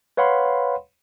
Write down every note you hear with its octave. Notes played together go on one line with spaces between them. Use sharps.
B4 C#5 F5 F#5 B5 C6